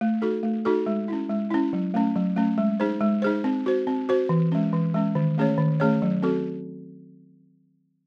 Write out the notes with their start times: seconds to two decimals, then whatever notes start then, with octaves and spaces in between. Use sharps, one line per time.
0.01 A3
0.22 D#4 F#4 A4
0.43 A3
0.65 D#4 F#4 A4
0.86 G#3
1.08 C#4 E4
1.30 G#3
1.51 C#4 E4
1.73 F#3
1.94 A3 C#4
2.16 F#3
2.36 A3 C#4
2.58 G#3
2.80 D#4 G#4 C5
3.01 G#3
3.22 D#4 G#4 C5
3.44 C4
3.66 F#4 C5
3.87 C4
4.09 F#4 C5
4.29 E3
4.52 G#3 C#4
4.73 E3
4.94 G#3 C#4
5.15 D#3
5.38 A3 C#4 G#4 C#5
5.58 D#3
5.80 A3 C#4 G#4 C#5
6.02 F#3
6.23 C4 F#4 A4